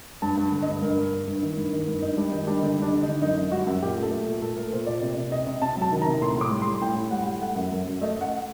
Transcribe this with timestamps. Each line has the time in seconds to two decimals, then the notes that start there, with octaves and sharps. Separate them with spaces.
0.22 G2 A5
0.37 G2
0.52 D3
0.62 D#5
0.68 G2
0.82 G2 A#4
0.97 G2
1.13 G2
1.27 G2
1.43 D#3
1.57 G2
1.73 D#3
1.88 G2
2.02 G2 D#4
2.17 G3 D4
2.32 D#3 D#4
2.47 G3 D4
2.62 D3 D#4
2.78 G3 D4
2.92 D3
3.03 D#4
3.08 D3
3.22 F#2 D#4
3.37 F#2
3.52 G3 F#4
3.67 F#2
3.82 A#2 G4
3.97 A3
4.03 A4
4.12 A3
4.26 A#2
4.42 A3 A4
4.56 A3 A#4
4.72 A#2 C5
4.87 A#2 D5
5.01 C3 D5
5.17 C3
5.32 C3 D#5
5.47 C3
5.62 C3 A5
5.77 F#3 A5
5.92 D#3
6.02 A#5
6.06 C3
6.22 A2 C6
6.36 A2 D6
6.51 G3
6.62 C6
6.67 G3
6.81 A2 G5
6.96 A2
7.11 G3 F#5
7.27 G3
7.42 A3 F#5
7.56 F#2
7.72 F#2
7.87 F#2
8.01 A3 D#5
8.16 A3 F#5